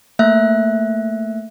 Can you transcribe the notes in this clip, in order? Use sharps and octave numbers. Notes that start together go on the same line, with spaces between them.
A3 A#3 E5 F#6